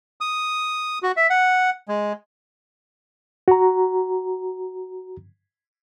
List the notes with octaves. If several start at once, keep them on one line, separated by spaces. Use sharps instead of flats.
D#6
F#4
E5
F#5
G#3
F#4 A#5